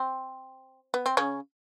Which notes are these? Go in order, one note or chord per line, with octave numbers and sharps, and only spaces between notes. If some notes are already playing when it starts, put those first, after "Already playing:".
Already playing: C4
B3
C4
C#3 C#4